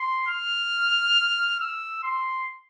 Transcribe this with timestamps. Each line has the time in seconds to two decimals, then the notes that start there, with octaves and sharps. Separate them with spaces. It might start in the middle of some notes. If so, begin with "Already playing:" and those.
Already playing: C6
0.27 F6
1.60 E6
2.03 C6